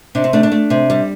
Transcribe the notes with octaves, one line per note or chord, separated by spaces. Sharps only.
C3 D4
C4
A3 D4
D4
A3
C3
G3